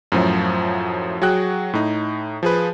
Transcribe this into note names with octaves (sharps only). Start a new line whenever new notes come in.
F#2 A2 F3 F#3
F#3 F#4 G#4 G5 F#6
A2 D#4
F3 G#4 B4